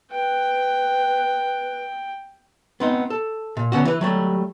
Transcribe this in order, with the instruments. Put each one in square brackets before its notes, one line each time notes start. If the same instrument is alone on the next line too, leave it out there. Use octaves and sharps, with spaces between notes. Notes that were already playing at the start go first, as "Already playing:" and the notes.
[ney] B4 [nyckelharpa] G5
[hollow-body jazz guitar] B3 C4 D#4
A4
A#2
D3 B3 C#4 F#4
E3 B4
F#3 G3 A3